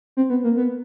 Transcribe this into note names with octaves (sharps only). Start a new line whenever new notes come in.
C4
B3
A#3
B3